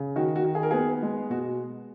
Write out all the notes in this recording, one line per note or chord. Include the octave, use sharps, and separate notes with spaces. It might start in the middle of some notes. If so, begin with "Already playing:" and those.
Already playing: C#3
D#3 F#4
F#4
D#3
G#4
A#4
B3 G#4
G#3
B2 F#4